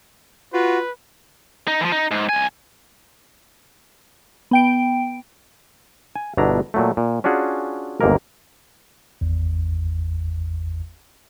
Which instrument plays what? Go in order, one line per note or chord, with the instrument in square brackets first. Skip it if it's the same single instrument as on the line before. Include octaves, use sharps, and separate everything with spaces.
[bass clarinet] F4 [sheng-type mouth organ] F#4 [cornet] B4
[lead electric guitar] D#4
E3 F3
D#4
G#2
C2 G#5
[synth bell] B3 G5 D7
[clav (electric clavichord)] G#5
G1 B2 D4 E4 A#5
A#2 F#3 A3
A#2
C#4 D4 F4 F#4 G#4
G1 D#2 G#2 A#3 A#4
[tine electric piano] G#1 E2